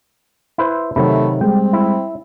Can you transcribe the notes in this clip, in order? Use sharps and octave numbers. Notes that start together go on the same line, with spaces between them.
E4 B4 C5
C3 D#3 F#3 A3 B5
G3 G#3 C4 G5
E4